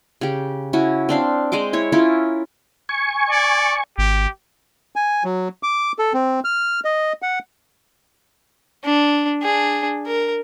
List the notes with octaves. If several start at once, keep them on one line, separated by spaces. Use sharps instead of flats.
C#3 G4
C#4 E4 F#4
C4 D4 F5
G#3 C5 D#5 D6
E4 C#5
C#4 E4 F4 A#4
G#5 C#6
D5
G#1 G4
G#5
F#3
D6
A4
C4
F6
D#5
F#5
D4
D4 G#4
A#4